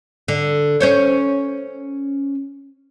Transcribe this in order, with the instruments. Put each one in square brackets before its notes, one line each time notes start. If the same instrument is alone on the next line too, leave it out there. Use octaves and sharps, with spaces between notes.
[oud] D3
C#4 C5 C#5